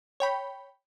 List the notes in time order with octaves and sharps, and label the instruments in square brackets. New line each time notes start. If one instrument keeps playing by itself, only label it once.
[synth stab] C#5 G5 B5